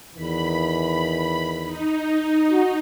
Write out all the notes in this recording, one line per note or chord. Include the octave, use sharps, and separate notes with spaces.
E2 D#3 E3 B5
D#4
F#4